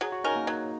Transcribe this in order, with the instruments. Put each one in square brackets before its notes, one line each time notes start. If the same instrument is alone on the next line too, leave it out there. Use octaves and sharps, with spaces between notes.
[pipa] F#3 [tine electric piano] G#4
[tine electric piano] F#4
[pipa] C#4 A#4 [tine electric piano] D#4
[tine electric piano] A#3
[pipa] F#3